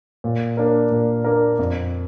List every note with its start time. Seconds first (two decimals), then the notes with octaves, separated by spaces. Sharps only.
0.24 A#2
0.57 A#3 D4 A#4
0.91 A#2
1.24 A#3 D4 A#4
1.59 F2